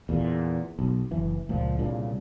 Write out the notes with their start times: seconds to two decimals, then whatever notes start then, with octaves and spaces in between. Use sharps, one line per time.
0.09 E2 A#2
0.79 B1
1.11 F#1 E3
1.49 C#2 A#2 F3
1.79 C2 G2 A#2 C#3